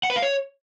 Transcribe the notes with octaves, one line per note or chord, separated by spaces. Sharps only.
F#5
B4
F5
C#5